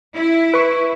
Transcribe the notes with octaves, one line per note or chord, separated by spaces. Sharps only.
E4
B4 C#6